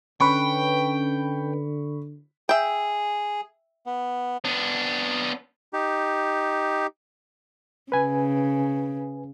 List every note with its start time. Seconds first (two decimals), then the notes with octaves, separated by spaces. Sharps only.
0.21 D3 C#4 B4 G5 B5 C#6
2.49 G#4 E5 G5
3.86 B3
4.45 B3 D4
5.73 D#4 G4
7.92 C#3 B4 G#5